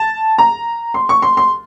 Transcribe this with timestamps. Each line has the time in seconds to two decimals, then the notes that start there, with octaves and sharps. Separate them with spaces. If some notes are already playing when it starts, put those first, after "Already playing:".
Already playing: A5
0.38 A#5
0.94 C6
1.09 C#6
1.22 C6
1.37 C6